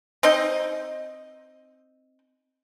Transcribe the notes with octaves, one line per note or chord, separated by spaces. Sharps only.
C4 D#4 D#5